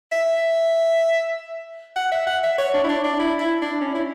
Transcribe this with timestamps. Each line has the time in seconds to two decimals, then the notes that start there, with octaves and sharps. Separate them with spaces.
0.12 E5
1.96 F#5
2.12 E5
2.27 F#5
2.44 E5
2.58 C#5
2.74 D4
2.84 E4
2.89 D4
3.04 D4
3.19 E4
3.40 E4
3.62 D4
3.81 C#4
3.95 E4